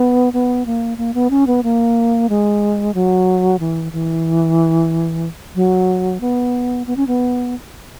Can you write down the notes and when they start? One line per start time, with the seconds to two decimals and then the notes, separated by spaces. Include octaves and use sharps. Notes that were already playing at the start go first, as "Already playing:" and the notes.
Already playing: B3
0.33 B3
0.66 A#3
0.98 A#3
1.14 B3
1.30 C#4
1.47 B3
1.63 A#3
2.29 G#3
2.94 F#3
3.59 E3
3.93 E3
5.55 F#3
6.21 B3
6.87 B3
6.97 C#4
7.07 B3